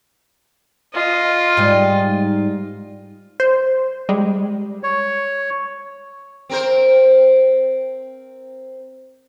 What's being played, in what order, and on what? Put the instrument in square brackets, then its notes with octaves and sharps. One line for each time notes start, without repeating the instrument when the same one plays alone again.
[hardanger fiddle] F4 D#5
[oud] G#2 G3
[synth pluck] C5
G3 G#3
[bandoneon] C#5
[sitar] C4 A#4 C5